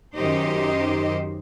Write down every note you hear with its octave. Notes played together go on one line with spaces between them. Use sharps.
F#2 D#3 D#4 G4 C5 D#5